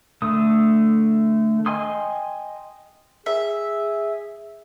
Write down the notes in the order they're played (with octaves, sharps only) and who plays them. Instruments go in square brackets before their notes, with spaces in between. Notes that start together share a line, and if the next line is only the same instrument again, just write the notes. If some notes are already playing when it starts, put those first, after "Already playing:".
[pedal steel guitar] D3 A3 D#6
D#5 G5 G#5 C6 D#6
[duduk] G#4 [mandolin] E5